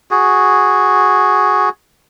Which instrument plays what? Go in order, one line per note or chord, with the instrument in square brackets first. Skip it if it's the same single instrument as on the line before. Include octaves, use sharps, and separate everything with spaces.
[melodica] F#4 G#4